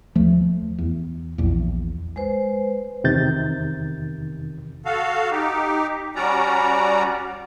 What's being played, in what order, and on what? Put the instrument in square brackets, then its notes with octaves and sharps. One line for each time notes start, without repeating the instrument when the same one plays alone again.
[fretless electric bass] D#2 F3 A3
E2
A#1 E2
[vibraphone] G#3 B4 C5
[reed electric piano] E2 C3 D#3 G6 A6
[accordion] F#4 A4 F5
D#4 G4
G3 C#4 F#4 D5 A#5